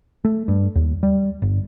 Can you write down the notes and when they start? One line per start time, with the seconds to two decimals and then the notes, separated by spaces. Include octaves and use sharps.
0.25 A3
0.48 G2
0.76 D#2
1.03 G3
1.42 G1